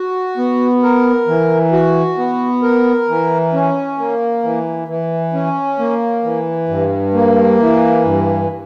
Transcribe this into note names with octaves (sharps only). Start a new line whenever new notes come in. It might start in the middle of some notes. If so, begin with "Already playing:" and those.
Already playing: F#4
B3
A#4
E3
F#4
B3
A#4
E3
C#4
A#3
E3
E3
C#4
A#3
E3
G2
A#3
E3
G2